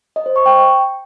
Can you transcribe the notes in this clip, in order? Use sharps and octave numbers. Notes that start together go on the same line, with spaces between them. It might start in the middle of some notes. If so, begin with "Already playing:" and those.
D#5
C5
C#6
G5